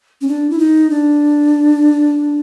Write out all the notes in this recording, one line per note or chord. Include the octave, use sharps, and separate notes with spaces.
C#4
D4
E4
D#4
D4